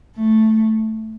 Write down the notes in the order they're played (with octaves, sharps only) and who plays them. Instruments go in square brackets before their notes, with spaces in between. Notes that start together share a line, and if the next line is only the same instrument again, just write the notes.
[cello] A3